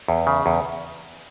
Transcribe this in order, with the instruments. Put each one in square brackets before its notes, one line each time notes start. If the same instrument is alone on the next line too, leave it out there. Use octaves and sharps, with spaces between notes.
[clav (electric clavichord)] E2
C#3
E2